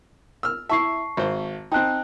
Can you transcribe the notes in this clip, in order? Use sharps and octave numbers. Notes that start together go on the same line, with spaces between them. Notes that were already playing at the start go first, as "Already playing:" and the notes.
E6 F6
E4 E5 A5 C#6 C7
G#1 C5
C4 D#4 G5 A5 F#6